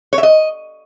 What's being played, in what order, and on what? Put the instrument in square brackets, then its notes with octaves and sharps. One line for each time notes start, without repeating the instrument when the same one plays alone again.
[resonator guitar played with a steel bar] C#5
E5
D#5